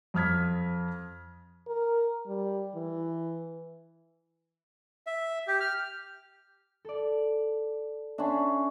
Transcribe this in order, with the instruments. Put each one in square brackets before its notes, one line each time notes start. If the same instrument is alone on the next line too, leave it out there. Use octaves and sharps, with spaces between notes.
[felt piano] F2 D#6 F6 G#6 B6
[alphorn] A#4
G3
E3
[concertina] E5
G4
F6
[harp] A4 D5
[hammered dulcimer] C#4 D4 [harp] E5 F#5 C6